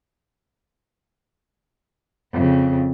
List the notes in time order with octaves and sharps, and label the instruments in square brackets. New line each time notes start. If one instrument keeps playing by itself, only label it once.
[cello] F2 C#3